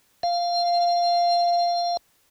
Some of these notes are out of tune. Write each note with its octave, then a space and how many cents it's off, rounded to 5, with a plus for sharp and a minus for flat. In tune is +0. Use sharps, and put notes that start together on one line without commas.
F5 -5